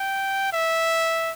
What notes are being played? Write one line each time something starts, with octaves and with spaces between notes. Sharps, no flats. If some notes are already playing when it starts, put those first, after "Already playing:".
Already playing: G5
E5